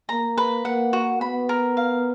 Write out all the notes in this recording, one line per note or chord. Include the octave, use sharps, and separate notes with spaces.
A#3 A#5
B4
A#3 F#5
F#4
B3 B5
A#4
F5